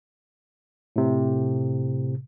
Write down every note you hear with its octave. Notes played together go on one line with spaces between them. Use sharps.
A2 C3